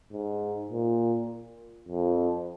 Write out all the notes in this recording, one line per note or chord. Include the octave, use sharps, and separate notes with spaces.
G#2
A#2
F2